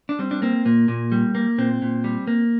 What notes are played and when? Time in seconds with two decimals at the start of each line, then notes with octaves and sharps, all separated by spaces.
0.09 D4
0.19 G3 C4
0.31 D4
0.42 A#3 C4
0.65 A#2 A#3
0.88 A#2
1.12 G3
1.35 A#3
1.58 A#2 C4
1.82 A#2
2.04 G3
2.27 A#3